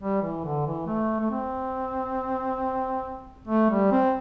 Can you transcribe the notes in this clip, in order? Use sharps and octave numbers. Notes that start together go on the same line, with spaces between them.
G3
E3
D3
E3
A3
A3
C4
A3
G3
C4